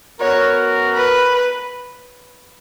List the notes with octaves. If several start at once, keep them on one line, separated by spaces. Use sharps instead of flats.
B3 F#4 A#4 C#5
B4